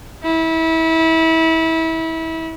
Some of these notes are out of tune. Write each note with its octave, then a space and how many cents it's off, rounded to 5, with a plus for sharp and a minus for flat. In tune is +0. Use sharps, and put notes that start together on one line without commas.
E4 -30